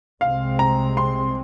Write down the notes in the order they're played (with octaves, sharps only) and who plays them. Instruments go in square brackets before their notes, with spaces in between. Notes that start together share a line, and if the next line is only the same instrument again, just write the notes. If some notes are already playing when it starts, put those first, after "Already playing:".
[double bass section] C2 C3 G#3 C4 [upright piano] F5
[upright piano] A#5
C6